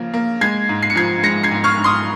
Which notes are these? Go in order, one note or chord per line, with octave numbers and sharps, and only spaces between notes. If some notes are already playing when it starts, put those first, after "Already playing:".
Already playing: C#3 F3 A#3
A#3
G#3 G#6 C7
G#2
C7
C#7
F3 G#6 C7
G#3 A#6 C#7
G#6 C7
G#2
C#6 F6
G#2
C6 D#6